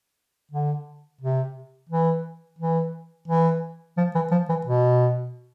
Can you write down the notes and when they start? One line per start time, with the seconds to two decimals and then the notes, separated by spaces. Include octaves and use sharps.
0.52 D3
1.21 C3
1.89 E3
2.59 E3
3.28 E3
3.97 F3
4.15 E3
4.31 F3
4.49 E3
4.66 B2